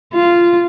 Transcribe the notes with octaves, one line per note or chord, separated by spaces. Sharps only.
F4